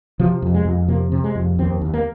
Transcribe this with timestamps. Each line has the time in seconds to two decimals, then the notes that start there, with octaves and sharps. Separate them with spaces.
0.19 C3 F3
0.42 F2
0.54 G#3
0.65 F2
0.88 C3 A#3
1.12 C3
1.24 G#3
1.35 F2
1.59 D#2 C4
1.81 D#2
1.94 A#3